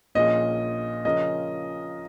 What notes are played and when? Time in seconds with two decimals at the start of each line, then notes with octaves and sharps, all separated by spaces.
0.15 A#1 A#2 F3 C#4 G#4 D#5
1.05 C#3 F3 C#4 A#4 D#5